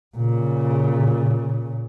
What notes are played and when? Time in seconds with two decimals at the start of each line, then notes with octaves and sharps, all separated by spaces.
0.17 A#2 C#3